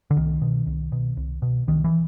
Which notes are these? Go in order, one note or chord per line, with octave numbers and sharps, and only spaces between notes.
D3
C2 D#3
B2
C2
B2
C2
B2
C2 D#3
E3